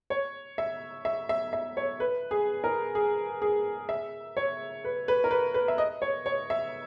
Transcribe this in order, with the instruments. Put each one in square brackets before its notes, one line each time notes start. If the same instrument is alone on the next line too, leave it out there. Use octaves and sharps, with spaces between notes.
[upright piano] C#5
E5
E5
E5
E5
C#5
B4
G#4
A#4
G#4
G#4
E5
C#5
B4
B4
A#4
B4
B4
E5
D#5
C#5
C#5
E5